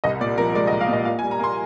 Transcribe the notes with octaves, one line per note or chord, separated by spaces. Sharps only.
C2 D#5
A#2 D5
F3 A#4
G#3 D5
D#5
C2
F5
A#2 D#5
A#2 F5
G#5
G3
A#5
A#3 C6